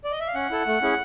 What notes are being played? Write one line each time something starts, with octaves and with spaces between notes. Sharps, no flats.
D5
D#5
E5
F5
C#4 F#5
E4 A4
A3
C#4 E4 G#4